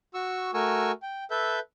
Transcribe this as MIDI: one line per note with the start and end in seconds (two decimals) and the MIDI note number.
0.14 0.51 66
0.14 0.51 85
0.14 0.51 88
0.54 0.92 57
0.54 0.92 66
0.54 0.92 70
0.54 0.92 80
0.54 0.92 85
0.54 0.92 88
1.02 1.24 79
1.31 1.59 69
1.31 1.59 71
1.31 1.59 76
1.31 1.59 91